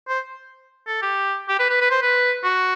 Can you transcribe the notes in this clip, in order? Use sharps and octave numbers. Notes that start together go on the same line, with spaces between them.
C5
A4
G4
G4
B4
B4
B4
C5
B4
F#4